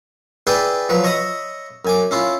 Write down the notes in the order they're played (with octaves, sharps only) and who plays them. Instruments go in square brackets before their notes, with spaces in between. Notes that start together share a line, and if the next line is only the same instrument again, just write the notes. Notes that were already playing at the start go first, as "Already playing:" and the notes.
[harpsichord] E4 G#4 B4 D5 G5 G#5
F3 F#3 B4
C#5 D#5 E5 B5 D#6
F#2 G#5 D6
C#4 E4 F4